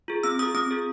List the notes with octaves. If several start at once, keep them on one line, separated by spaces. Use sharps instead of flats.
F4 G#4
C4 E6
F4 G#4 D#6
C4 D#6
F4 G#4